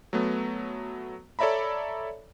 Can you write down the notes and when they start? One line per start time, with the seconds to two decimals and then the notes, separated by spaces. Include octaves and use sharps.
0.13 F#3 A3 B3
1.39 A4 C#5 D5 E5 A#5 B5